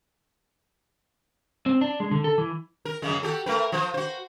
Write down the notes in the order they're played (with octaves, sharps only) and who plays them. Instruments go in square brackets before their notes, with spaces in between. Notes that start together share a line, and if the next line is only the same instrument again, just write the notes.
[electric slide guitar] C4
D4
G#3
D3
A4
E3
[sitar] A#4
F#2 C#3 G#3
F#4 G4 A4
A3 A#4 B4
F3 C5
F#4 C5